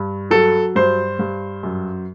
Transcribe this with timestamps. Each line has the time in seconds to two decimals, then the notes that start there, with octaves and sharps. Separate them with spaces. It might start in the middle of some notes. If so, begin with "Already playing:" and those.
Already playing: G2
0.31 F#3 A4
0.75 G2 C5
1.19 G2
1.63 F#2